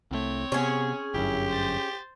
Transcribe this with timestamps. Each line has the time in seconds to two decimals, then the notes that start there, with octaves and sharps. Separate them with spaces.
0.11 C2 A3 C4 C#5
0.52 C3 B3 C#4 G#4
1.14 G1 F#2 E4 G4
1.49 C5 A6